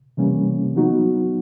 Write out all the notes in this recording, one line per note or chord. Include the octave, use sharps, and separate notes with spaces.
C3 E3 G3 A#3 C#4
F#3 B3 D#4 F#4